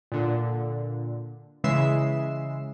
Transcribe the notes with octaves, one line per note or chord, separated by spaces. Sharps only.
A#2 D3
C#3 E3 G#3 E5 C7 E7